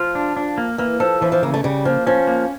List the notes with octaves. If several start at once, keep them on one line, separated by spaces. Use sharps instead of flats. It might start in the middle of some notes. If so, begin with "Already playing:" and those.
Already playing: F3 F4
D4
D4
A#3
E3 A#3
F3 A4
E3 F3
F3
C#3 A#3
A3
C#3 G3
F3 A#3
F3 C#4
A#3